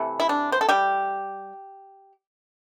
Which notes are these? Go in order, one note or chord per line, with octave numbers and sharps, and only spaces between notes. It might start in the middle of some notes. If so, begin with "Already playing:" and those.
Already playing: C3 E3 A3
E4
D4
C5
A4
G3 G4